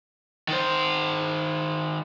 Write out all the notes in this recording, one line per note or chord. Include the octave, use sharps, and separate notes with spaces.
D#3 C5